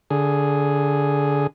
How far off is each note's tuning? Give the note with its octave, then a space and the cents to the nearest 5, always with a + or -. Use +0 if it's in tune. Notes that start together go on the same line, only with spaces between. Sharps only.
D3 -15 G#4 +0